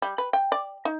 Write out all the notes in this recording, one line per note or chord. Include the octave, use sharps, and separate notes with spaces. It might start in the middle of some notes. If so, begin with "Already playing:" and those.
G3
B4
G5
D5
D#4